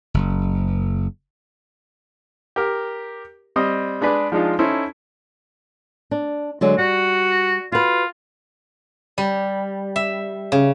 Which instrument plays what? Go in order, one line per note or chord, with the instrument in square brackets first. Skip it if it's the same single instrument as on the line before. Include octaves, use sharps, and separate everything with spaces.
[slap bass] F#1
[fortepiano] G4 A#4
G3 C4 D#5 D#6
G#3 D4 G#4 B4 D5
F3 G#3 D4 D#4 F4
C#4 D#4 E4 A4 C5
[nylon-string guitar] D4
D3 F#3 G#3
[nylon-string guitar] G3 [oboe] F#4
[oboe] F4 [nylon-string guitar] F#4 B4
[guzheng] G3
E5
C#3